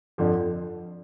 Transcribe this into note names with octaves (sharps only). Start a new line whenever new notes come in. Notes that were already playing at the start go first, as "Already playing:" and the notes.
F2 D3 F3